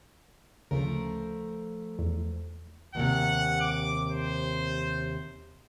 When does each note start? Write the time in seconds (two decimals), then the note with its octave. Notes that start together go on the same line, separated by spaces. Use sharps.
0.71 D2 C#3 F3 A3 A#4
1.99 E2
2.95 D#2 A2 C3 F#5
3.61 D6
4.11 C5